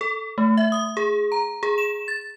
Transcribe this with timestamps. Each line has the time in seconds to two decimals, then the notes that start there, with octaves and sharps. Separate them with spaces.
0.01 A4
0.38 A3
0.57 E5
0.72 D#6
0.97 G#4
1.32 A#5
1.63 G#4
1.78 E7
2.08 A6